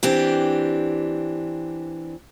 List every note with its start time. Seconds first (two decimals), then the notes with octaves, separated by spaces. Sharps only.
0.03 E3 C4 D4 G4